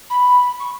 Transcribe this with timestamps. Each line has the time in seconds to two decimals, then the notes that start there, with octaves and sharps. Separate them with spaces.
0.09 B5
0.59 C#6